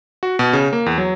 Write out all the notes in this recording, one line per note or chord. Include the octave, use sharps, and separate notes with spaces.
F#4
B2
C#3
A#3
E2
F#3